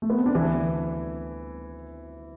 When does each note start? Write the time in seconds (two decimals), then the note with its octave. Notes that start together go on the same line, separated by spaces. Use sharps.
0.02 A3
0.10 B3
0.18 C4
0.26 D4
0.35 D2 D3 E3 E4